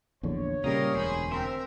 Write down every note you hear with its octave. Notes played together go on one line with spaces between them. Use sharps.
A#1 E2 D3 C#5
A#2 C#3 G3 G4 A#4 D#5 F5 A#5
E1 D2 G#4 C5 B5
C4 A#4 E5